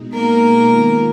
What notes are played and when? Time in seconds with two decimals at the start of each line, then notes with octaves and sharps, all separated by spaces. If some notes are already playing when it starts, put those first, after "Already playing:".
Already playing: B2 G#3 D#4
0.14 A#3 A#4
0.58 D#3 G#3 B3 F4